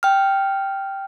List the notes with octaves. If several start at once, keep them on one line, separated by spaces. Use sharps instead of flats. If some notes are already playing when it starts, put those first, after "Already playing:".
G5 F6